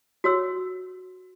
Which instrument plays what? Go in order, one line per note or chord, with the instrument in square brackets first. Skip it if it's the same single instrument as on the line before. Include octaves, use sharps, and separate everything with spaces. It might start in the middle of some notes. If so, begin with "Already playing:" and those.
[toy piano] F#4 C#5 E6